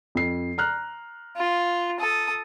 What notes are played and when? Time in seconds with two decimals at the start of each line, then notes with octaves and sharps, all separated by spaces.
0.15 F2 C7
0.58 A#5 F6 F#6
1.37 F4
2.00 A4 D#6